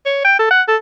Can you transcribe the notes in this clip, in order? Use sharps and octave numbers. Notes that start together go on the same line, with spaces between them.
C#5
G5
A4
F#5
A4